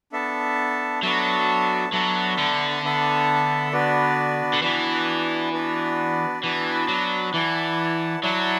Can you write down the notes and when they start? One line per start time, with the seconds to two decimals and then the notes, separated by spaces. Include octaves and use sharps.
0.12 B3 D4 A4 E5 A5
1.03 F#3 B3 D4 A4 E5 A5
1.92 F#3 B3 D4 A4 E5 A5
2.38 D3
2.83 B3 D4 A4 E5 A5
3.72 B3 D4 F#4 B4 D5
4.53 D3
4.62 E3 B3 D4 F#4 B4 D5
5.53 B3 D4 F#4 B4 D5
6.43 E3 B3 D4 F#4 B4 D5
6.88 F#3
7.33 E3 E4 D5 F#5 A5
8.23 F#3 E4 D5 F#5 A5